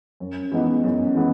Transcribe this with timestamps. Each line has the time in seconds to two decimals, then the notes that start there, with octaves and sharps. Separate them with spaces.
0.20 F#2
0.52 E3 G#3 B3 D#4
0.84 F#2
1.15 E3 G#3 B3